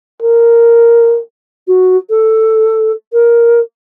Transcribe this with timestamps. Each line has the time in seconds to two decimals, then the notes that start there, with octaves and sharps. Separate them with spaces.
0.23 A#4
1.68 F#4
2.10 A4
3.13 A#4